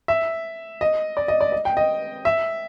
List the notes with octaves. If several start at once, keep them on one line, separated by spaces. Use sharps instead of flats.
E5
D#5
D5
D#5
D5
D#5
G5
D#5
E5